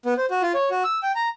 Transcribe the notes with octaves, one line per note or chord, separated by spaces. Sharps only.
B3
C5
F#4
F4
C#5
F#4
E6
G5
A#5